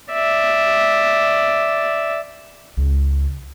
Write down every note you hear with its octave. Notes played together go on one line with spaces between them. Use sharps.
D5 E5
C#2